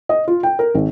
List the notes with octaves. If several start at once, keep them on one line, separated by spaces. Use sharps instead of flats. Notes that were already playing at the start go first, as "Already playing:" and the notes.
D#5
F4
G5
A#4
G#1